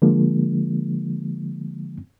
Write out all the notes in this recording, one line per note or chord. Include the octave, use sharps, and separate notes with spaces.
D3 F3 G#3 A#3